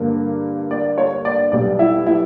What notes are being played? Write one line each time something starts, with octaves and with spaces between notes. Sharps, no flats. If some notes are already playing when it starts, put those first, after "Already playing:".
Already playing: G2 D3 A#3
D5
C#5
D5
B1 B2 G3 D5
E4 E5
E4 E5